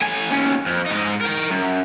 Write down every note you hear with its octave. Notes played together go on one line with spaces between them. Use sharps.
A2 G#5
D#2 C#4
F2
G#2 D#4
A#4 G5
F#2